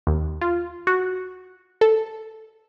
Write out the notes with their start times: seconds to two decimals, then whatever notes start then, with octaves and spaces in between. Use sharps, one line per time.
0.07 D#2
0.41 F4
0.87 F#4
1.81 A4